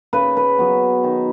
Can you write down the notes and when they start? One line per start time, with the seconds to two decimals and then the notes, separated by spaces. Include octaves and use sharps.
0.13 C#3 B4
0.37 B4
0.59 F#3 B3
1.04 D#3